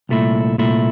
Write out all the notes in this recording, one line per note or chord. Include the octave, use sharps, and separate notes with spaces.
C2 A#2 A3 E4
C2 A#2 A3 E4